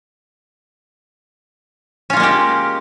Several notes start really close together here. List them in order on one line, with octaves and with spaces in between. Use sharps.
C#4 F4 A#3 G#3 G4